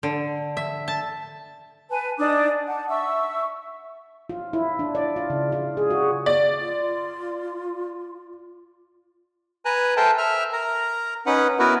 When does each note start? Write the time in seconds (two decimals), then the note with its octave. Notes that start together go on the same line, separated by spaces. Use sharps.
0.03 D3
0.57 E5
0.88 A5
1.90 B4 G#5 A5
2.19 D4 D#4 D6 D#6
2.66 F#5 A5
2.89 E5 C#6 E6
4.29 F4
4.53 E4
4.79 D4
4.95 D5
5.16 F4
5.30 C#3
5.52 F4
5.77 G#4
5.90 F#4
6.26 D5
6.61 F4
9.65 B4 G#5 A#5 F#6
9.97 A4 A#4 C5 E5 G5 A5
10.18 E5 F6
10.53 A#4 A#5
11.26 C#4 D#4 B4 F#5
11.59 B3 E4 F#4 A#4 B4